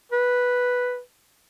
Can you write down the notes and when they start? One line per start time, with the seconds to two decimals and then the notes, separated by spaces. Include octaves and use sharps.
0.12 B4